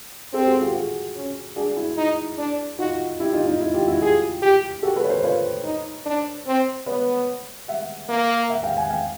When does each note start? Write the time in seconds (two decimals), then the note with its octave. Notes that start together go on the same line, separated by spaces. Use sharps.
0.33 C4 G4 A4
0.47 F#4 G#4
0.61 F4 G4
0.75 F#4 G#4
1.16 C#4
1.56 D4 F#4 G#4
1.77 E4
1.97 D#4
2.38 D4
2.79 D#4 F4 F#4
3.19 E4 G4
3.33 D#4 F4
3.46 D#4
3.60 E4
3.74 F4 G4
3.87 E4 F#4
4.01 F4 G4 G#4
4.42 G4
4.83 F#4 G4 A4
4.96 A4 B4
5.04 C#5
5.10 A#4 C5
5.23 F4 B4 C#5
5.64 D#4
6.06 D4
6.46 C4
6.86 B3 B4 C#5
7.68 E5 F#5
8.09 A#3
8.50 E5 F#5
8.63 F5 G5
8.76 F#5 G#5
8.90 F5 G5